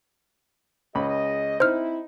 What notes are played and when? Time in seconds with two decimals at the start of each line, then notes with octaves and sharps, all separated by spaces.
0.95 C#2 G#4 D#5 B5
1.60 C4 D#4 E4 C5 F6